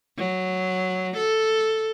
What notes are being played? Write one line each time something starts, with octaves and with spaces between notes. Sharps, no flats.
F#3
A4